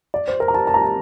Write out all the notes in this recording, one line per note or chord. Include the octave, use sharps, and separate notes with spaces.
D5
C5
A#4
A#5
A5
A5
A#5
A5